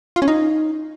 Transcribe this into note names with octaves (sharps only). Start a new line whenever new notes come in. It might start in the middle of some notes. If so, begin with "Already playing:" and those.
F4
C#4
D#4